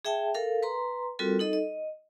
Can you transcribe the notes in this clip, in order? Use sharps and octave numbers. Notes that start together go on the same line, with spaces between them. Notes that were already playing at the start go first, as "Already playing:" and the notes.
G#4 E5 G5 A5
A4 A#4 F5
B4 A#5 C6
G3 C4 F4 F#4 A4 A#4
D#4 A4 D#5
D#5